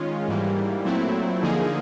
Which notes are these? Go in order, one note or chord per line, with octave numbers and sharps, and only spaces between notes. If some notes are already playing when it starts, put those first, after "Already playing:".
Already playing: D#3 G#3 C#4 F4
G#2 E3 G3 A#3
A#2 F#3 A3 C4 E4
D3 F3 A#3 D#4 G#4